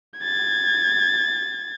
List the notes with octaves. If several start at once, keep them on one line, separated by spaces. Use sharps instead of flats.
G#6 A6